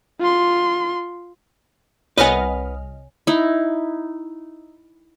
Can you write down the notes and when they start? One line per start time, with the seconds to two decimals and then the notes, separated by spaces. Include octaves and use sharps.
0.20 F4 C6
2.18 C2 B4 C#5 D#5 F#5 G#5 F6
3.27 D#4 E4